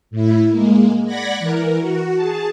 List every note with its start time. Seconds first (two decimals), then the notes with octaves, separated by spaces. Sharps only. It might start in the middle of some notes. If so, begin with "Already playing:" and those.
0.11 A2 E4
0.50 G#3 A#3
1.05 D5 F#5 B5 F#6 G#6 A#6
1.40 E3 A#4
1.80 F#4
2.15 G#4 A5